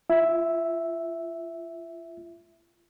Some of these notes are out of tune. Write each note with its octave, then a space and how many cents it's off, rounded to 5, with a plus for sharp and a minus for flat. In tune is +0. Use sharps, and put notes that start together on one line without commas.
F4 -35 E5 +0